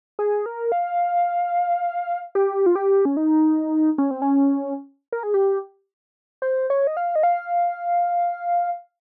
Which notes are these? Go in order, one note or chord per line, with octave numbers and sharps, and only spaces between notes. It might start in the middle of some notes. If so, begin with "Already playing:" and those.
G#4
A#4
F5
G4
F4
G4
C#4
D#4
C#4
C4
C#4
A#4
G#4
G4
C5
C#5
D#5
F5
D#5
F5